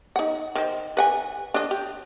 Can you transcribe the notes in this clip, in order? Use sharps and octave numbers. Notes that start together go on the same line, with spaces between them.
D#4 F#5
D#3 C5
B4 F#5 G#5
D4 D#5
G4